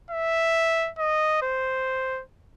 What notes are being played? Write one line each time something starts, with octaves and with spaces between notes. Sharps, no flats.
E5
D#5
C5